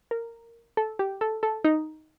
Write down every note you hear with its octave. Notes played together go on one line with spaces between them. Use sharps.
A#4
A4
G4
A4
A4
D#4